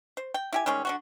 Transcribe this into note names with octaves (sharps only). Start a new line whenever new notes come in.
C5
G5
E4 G4 G#5
D#3 G3 G#3 C#4
D3 G3 F#4